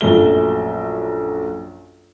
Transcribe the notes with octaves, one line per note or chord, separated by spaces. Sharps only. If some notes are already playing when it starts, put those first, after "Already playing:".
A#1 F#2 A3 G7